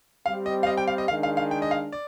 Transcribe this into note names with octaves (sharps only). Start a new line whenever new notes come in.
G3 C4 G4 F5
D#5
F5
D#5
G5
F5
D#5
D#3 G#3 D4 F5
F5
F5
G5
D#5
F5
D5